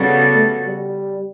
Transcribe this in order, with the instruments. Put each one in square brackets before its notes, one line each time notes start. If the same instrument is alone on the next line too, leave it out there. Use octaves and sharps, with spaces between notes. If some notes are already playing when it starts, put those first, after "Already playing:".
Already playing: [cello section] C#3 G3 B3 F#4 A4
[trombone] A3
G3